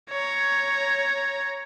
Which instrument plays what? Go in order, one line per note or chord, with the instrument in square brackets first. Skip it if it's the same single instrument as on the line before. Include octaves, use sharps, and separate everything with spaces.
[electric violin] C#5 A#5